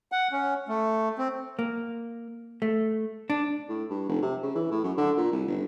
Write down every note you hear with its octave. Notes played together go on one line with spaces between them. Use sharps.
F#5
C#4
A3
C4
A#3
A3
D4
A2
G2
F1
C3
C#3
E3
A2
F#2
D3
A#2
C2
G1